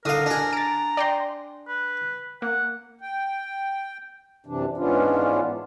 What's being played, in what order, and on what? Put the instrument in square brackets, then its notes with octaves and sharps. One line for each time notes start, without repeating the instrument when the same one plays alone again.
[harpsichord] D3 F5 [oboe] A#4 [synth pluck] D#6 D#7
[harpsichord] D4 G#4
[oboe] A#5 [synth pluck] A6 D7
[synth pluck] D5 G5 C6
[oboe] B4
[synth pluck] A#3 [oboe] F#5
[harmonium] G5
F#2 C3 E3 D4
G#2 E3 B3 C#4 D4 F4